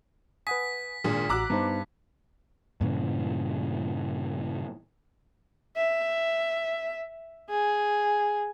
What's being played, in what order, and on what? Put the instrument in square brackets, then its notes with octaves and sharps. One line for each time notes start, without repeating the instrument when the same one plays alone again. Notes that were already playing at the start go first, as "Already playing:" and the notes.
[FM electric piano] B4 F#5 G#5 [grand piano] D#6 [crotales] B6
[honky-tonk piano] G#1 A#2 D4 [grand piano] G#4
[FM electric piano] A1 F#4 [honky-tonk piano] A#5 D6 F#6 [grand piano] E6
[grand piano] G2 [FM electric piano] B3 D#4 C5
[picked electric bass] G2 A#2 C#3 E3
[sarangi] E5
G#4